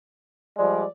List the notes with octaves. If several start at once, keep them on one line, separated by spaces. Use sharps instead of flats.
F3 G3 G#3 D5